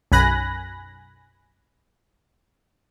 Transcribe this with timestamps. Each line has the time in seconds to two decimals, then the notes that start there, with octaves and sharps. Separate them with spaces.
0.12 B1 F#2 G#5 B5 F#6 A#6